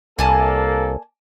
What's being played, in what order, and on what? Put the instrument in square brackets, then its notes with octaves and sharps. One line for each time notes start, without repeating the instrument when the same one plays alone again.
[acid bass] C2 [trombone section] A#3 A4 [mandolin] D5 G#5 A5